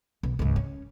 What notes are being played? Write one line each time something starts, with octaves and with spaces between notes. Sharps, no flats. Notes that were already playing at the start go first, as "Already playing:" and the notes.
B1
C#2 G#2
C#4